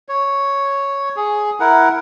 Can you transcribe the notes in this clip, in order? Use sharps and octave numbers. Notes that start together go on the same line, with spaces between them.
C#5
G#4
E4 A#4 F#5